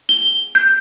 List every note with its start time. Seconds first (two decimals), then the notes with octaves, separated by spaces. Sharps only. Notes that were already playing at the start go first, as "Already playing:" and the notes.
0.09 G7
0.55 G6